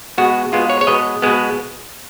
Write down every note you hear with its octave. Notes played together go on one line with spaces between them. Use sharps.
B2 G#3 B3 F#4
B2 G#3 B3 F4
C#5
C#5
B2 G#3 B3 D#5
B2 G#3 B3